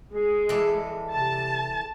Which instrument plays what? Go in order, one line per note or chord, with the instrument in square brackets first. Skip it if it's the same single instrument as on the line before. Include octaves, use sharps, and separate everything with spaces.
[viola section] G#3 [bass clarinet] G#4
[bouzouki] E3 G3 A4
[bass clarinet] C3 [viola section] A5